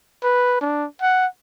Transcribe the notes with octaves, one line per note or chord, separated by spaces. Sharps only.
B4
D4
F#5